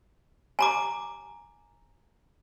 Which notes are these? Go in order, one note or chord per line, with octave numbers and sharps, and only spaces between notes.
G#5 A#5 D6